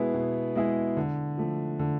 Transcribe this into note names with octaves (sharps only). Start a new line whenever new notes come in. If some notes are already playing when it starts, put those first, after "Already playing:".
Already playing: B2 G#3 B3 E4 G#4
B2
G#3 B3 E4 G#4
D3
F3 A3
D3